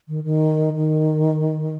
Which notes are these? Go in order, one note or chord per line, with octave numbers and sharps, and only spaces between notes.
D#3
D#3
D#3